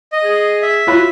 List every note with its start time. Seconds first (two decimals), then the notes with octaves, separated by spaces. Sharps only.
0.12 D#5
0.24 G#4
0.62 E5
0.87 F4 F#4 B4 C#5 B5